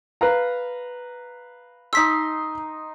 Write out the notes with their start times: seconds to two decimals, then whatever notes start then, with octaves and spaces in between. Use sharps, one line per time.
0.21 B4 F5 A#5
1.93 D#4 C6 E6 B6